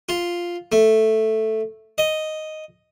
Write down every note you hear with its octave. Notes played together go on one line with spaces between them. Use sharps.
F4
A3
D#5